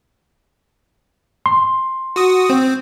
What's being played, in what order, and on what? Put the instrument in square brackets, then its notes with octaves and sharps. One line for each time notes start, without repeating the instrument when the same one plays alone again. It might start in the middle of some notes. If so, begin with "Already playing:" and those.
[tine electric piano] C6
[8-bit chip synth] F#4 D#6
C4